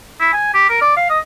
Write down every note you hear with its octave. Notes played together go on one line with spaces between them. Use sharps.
E4
G#5
G4
A#4
D5
F5
D#5